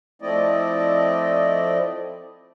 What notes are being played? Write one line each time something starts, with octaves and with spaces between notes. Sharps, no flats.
F3 A3 C4 E4 D5 D#5